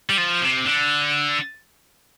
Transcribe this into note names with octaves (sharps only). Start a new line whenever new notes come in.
G3
F3
C3
D3